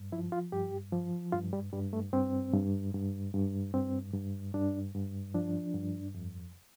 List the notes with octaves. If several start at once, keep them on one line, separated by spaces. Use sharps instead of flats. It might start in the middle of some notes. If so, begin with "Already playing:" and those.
Already playing: G2
F3 E4
F4
G2 G4
F3
G2 F4
G3
G2 G3
A3
G2 C4
G2
G2
G2
G2 C4
G2
G2 D4
G2
F3 D4
G2
F2